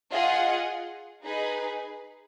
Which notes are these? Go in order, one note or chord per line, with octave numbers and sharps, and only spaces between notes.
F4 G#4 D#5 F#5
D#4 G#4 B4